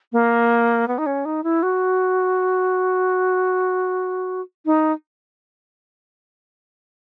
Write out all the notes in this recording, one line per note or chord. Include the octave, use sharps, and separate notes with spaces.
A#3
B3
D#4
C#4
D#4
E4
F#4
D#4